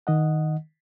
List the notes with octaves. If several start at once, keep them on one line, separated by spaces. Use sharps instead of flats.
D#3 D#5 F#5